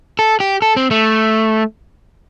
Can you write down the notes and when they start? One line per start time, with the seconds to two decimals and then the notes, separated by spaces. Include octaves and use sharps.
0.19 A4
0.40 G4
0.62 A4
0.76 C4
0.91 A3